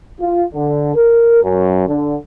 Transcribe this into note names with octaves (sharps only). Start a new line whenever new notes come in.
F4
D3
A#4
F#2
D3